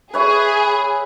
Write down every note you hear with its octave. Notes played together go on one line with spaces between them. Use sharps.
G#4 B4 C#5 E5